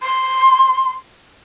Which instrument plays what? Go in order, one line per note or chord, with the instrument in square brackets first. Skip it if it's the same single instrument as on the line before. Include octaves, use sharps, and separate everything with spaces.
[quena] C6